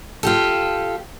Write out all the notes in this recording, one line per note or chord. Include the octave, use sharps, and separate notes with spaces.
F4 G4 A4